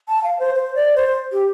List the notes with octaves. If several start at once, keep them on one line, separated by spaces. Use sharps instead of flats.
A5
F5
C5
C5
D5
C5
G4